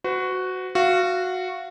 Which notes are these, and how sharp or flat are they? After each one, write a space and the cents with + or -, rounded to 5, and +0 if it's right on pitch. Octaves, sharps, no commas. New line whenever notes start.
F#4 +0 B4 +45
F#4 -10 F5 -30